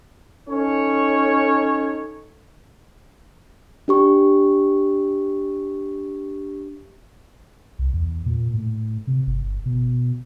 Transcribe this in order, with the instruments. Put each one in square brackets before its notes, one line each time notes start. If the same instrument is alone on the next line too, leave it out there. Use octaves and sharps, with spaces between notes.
[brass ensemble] C#4 D#4 A4 C#5
[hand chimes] D4 G4 C#6
[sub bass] C2
E2
A#2
A2
C3
G1
B2